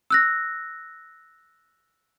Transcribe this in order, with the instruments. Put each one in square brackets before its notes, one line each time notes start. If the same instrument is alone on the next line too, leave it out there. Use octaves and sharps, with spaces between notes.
[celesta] E6 F#6 A#6